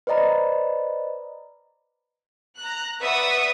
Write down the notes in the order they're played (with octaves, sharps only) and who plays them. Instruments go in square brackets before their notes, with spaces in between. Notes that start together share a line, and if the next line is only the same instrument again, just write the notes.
[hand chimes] B4 C5 D5 D#5 A#5 B5
[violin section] A#5 F#6
B4 D5 E5 F#5 C#6 D#6